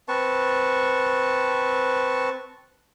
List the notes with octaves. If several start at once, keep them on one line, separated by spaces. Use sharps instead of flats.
C4 B4 A5 C#6